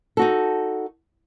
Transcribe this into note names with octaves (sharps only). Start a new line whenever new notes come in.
D#4 F#4 A4